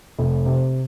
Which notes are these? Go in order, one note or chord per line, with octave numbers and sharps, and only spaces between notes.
F1
C3